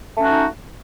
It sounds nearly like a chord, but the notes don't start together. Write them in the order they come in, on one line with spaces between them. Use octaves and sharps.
A3 C#4 F#4 D#4